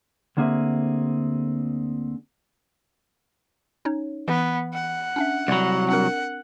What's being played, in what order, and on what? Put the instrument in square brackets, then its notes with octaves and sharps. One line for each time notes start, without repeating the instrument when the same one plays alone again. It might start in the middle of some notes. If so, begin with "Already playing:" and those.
[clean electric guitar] D2 D3 A#3 C4 G#4 E5
[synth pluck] C#4 D#4 C#5
[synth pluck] E3 [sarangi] B3
[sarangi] F#5
[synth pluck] C#4 D4 E5
[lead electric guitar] C2 F#3 [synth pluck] D5 B5
[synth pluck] C4 D4 A#4 [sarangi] F#5